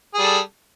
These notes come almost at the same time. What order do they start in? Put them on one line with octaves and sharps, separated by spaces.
G#4 G3 A4